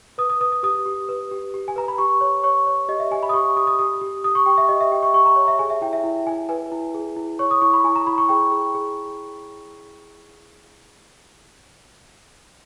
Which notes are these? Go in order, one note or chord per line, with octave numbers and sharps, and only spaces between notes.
B4 D#6
D#6
B4 D#6
D#6
G4 D#6
G4
B4
G4
G4
G#5
B4 A#5
B5
G4 C#6
C#5
C#5 C#6
C#5
G4 D#5
E5
G4 G#5
B5
D#6
G4 C#6
G4 D#6
D#6
G4 D#6
G4
G4 D#6
C#6
G4 G5
E5
G4 D#5
E5
G4 G5
C#6
G4 C#6
A#5
C#5
E5
G#4 G#5
E5
E4 G5
E5
E4
E4 G#5
B4 G#5
E4
G#4
E4
C#5 C#6
D#6
E4 C#6
B5
E4 G#5
A#5
E4 B5
C#6
G#4 G5
G#4
G#4